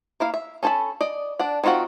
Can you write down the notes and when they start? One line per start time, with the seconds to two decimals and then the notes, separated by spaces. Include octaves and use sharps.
0.20 A#3 E4 F5
0.34 E5
0.63 C#4 A4 C5 A5 B5
1.01 D5 D#5
1.39 D4 D5 F#5
1.64 D#3 C4 F4 F#4 F#5